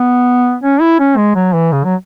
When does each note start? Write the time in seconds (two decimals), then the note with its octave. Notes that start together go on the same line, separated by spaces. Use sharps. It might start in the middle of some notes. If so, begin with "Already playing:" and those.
Already playing: B3
0.63 C#4
0.81 E4
0.99 C#4
1.17 G#3
1.35 F#3
1.54 E3
1.72 C#3
1.84 F#3